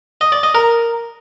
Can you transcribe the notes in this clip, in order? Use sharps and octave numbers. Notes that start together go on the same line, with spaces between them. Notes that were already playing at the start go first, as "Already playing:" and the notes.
D#5
D5
D#5
A#4